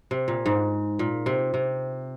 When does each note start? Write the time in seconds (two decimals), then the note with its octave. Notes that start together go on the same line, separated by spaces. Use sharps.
0.11 C3
0.28 A#2
0.46 G#2
0.99 A#2
1.26 C3
1.54 C3